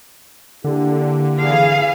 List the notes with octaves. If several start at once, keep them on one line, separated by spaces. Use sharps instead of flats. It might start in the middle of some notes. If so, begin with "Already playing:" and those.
D3 A#3 E4 G4
E3 G#4 F5